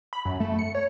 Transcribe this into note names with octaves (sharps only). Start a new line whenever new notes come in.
B5
F#2
A3
C#7
C#5